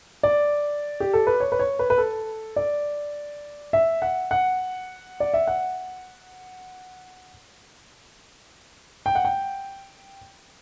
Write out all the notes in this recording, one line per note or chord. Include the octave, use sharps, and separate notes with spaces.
D5
G4
A4
B4
C#5
B4
C#5
B4
B4
A4
D5
E5
F#5
F#5
D5
E5
F#5
G5
F#5
G5